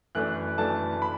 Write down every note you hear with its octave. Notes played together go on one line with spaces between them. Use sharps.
F#2 E3 A3 D4 F#6
F#2 E3 A3 D4 A5
B5